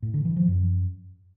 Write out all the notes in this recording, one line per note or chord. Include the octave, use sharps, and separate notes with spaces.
A2
D3
E3
F3
F#2